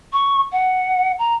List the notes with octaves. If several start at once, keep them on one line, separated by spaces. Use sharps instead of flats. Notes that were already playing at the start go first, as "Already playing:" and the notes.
C#6
F#5
A#5